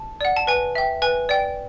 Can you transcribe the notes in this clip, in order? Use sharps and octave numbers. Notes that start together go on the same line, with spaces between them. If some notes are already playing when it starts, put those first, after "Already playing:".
Already playing: A5
D5 F#5
A5
B4 G#5
E5 G5
B4 G#5
D5 G5